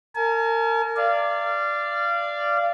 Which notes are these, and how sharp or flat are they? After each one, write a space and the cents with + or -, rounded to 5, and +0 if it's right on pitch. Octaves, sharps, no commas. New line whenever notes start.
A#4 -30 G#5 +40
D5 +0 F5 -25